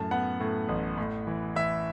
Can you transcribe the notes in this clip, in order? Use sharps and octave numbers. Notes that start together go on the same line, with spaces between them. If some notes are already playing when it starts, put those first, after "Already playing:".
Already playing: F#2 A2 A5
B3 F#5
A2
A1
A2
E3
E3 E5